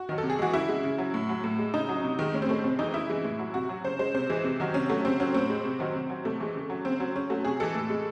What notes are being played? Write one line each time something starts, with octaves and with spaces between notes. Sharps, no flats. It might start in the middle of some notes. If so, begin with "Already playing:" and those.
Already playing: F#4
D#3 F#3
A4
C3
G#4
E3 G#3 F#4
C#3 E4
G#3
C#3
F#3
A2
F#3
A2
G#3
C#3 D#4
F#3
C3
D#3 G#3
A2 C#4
C4
G#3 A3
C3 C4
E3 G#3 D#4
C#3 E4
E3 G#3
A2
F#3
C3 F#4
F#3
C#3 C5
G#3 C5
C3 C5
E3 G#3
C3
D#3 F#3
C3 C#4
F#3 A3
C#3 C4
F#3 C#4
A2 C4
G#3
C3
D#3 F#3
C3
F#3
C3 A3
E3 G#3
C#3
F#3
C#3 C4
F#3 C4
C#3 C#4
F#3 A3
C3 G#4
E3 G#3 A4
A2
G#3